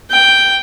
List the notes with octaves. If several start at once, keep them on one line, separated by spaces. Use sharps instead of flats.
G5